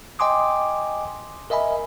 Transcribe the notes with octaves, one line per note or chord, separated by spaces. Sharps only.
D#5 G5 G#5 C6 D6 D#6
A#4 D#5 E5 G#5 B5